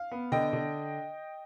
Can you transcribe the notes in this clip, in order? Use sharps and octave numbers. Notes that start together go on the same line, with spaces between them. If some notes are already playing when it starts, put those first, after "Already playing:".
Already playing: F5
B3
D3 D#5 G5
D3